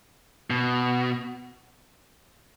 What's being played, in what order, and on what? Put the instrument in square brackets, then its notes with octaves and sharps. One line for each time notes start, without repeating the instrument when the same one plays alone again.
[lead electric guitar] B2